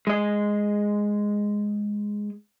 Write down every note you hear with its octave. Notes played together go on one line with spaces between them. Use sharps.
G#3 D#5